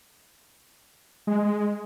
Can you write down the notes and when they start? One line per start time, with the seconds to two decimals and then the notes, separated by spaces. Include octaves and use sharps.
1.27 G#3